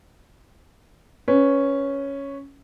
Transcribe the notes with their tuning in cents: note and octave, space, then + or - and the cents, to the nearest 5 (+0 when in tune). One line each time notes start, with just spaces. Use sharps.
C#4 +0 B4 +0